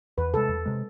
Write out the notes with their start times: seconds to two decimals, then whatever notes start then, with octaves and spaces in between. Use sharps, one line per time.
0.18 E2 B4
0.34 C3 G#3 A4
0.49 E2
0.66 C3 G#3